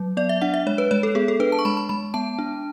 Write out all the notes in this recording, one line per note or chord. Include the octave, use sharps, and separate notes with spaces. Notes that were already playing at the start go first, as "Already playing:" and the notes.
Already playing: F#3
B3 D5
E5
D4 F#5
E5
G#3 C#5
B4
G#3 C#5
A4
B3 G#4
A4
D4 B4
A5
C#6
G#3 B5
B5
G#3 B5
B3 A5
D4